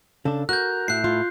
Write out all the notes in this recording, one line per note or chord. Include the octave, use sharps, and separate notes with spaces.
C#3 D4 A4
F#4 A#4 F#6 G6
A2 E4 F#6 C7
F4